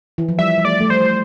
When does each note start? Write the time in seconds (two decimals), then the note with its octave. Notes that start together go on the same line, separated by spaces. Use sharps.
0.18 E3
0.29 F3
0.39 G3 E5
0.58 G3
0.65 A3 D5
0.81 A3
0.90 G3 C5